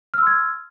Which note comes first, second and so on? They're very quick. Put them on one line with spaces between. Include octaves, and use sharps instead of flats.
F6 E6 C6 G#6